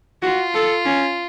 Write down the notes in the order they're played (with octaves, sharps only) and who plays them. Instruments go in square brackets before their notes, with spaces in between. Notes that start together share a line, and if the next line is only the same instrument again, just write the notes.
[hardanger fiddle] F4 [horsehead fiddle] F#4
[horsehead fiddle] A4
C#4